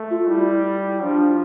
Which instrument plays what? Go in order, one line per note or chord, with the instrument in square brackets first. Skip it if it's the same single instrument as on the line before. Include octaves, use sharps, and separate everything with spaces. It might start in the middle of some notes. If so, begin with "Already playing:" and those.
Already playing: [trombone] A3
[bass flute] F4
[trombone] G3 [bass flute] E4
[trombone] F3 [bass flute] D4